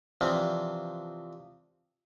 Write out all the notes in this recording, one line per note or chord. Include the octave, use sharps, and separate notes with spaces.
C3 E3 F3 C4 D4